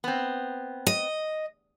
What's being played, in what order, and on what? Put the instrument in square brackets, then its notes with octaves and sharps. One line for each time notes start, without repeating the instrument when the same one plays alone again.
[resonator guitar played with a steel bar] B3 C4
[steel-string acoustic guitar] D#5